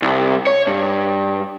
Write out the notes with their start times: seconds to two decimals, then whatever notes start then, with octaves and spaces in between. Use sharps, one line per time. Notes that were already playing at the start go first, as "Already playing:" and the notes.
0.02 C2
0.47 C#5
0.67 G2